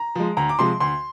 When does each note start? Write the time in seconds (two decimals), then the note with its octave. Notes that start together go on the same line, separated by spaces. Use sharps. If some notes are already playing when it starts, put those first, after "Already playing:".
Already playing: A#5
0.15 F3 G#3
0.37 D2 A#5
0.49 D6
0.59 C3 F3 G#3 C6
0.80 D2 C6